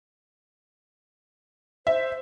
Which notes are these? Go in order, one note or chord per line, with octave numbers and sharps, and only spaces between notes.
C5 E5